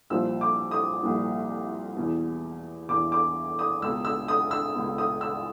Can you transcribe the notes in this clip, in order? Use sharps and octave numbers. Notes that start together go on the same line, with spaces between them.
C2 A#2 F3 E6
D6
D#6
C2 A#2 F3
E2 B2
E2 B2 D6
D6
D#6
C#2 B2 E6
E6
D#6
E6
C#2 B2
D#6
E6